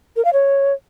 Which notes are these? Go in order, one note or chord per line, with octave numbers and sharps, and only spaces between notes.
A#4
F5
C#5